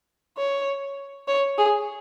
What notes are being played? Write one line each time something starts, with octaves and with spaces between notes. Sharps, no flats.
C#5
C#5
G#4